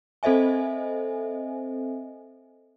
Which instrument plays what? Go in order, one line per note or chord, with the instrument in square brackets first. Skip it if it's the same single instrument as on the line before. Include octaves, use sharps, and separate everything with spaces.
[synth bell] C4 A4 C5 D#5 E5 G#5